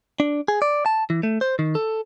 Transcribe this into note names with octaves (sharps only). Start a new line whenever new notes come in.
D4
G#4
D5
A5
E3
A3
C5
D#3
A4